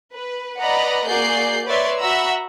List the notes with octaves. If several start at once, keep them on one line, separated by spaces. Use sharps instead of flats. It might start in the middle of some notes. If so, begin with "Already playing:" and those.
B4
B4 D5 D#5 F#5 A#5 B5
A#3 F#4 G#4 D5 G6 C7
B4 C#5 D5 E5 C6
F#4 E5 F#5 A#5 B5 E6